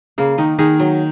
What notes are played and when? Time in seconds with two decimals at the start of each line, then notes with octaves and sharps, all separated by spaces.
0.18 C#3 A#3
0.38 D#3 D#4
0.58 D#3 G#4
0.79 F#3